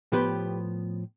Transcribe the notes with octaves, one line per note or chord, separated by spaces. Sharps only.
A2 F3 B3 G4 B4